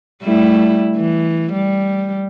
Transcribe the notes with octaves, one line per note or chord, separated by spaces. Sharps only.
G3 A3 E4
E3
G3